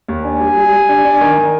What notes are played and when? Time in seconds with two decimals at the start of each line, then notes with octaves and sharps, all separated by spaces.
0.08 D#2
0.24 D4 G#5
0.40 G3
0.57 G3
0.73 G3
0.89 D4
1.05 D4
1.21 D#3
1.38 D#3